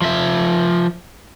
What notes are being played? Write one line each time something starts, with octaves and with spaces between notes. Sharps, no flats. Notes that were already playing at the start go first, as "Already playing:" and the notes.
F3 E5